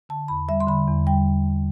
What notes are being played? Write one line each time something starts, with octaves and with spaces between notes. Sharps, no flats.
D3 A5
E2 B5
G3 E5
C6
D3 B5
E2
G3 G5